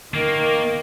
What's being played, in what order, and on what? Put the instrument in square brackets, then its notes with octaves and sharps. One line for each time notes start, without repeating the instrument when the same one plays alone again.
[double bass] D#3 [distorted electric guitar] A#3